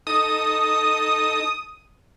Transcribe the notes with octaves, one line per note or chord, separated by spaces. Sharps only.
D#4 A4 D#6